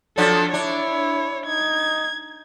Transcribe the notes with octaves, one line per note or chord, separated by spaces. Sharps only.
F3 F#3 D4 A4
D4 E4 C#5
D#4 G#6